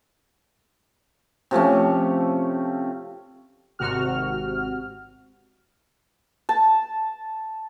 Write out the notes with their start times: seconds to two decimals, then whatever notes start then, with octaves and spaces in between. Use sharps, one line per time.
1.51 C3 F3 A3 C#4
3.79 G#1 C3 F#4 F6
6.49 A5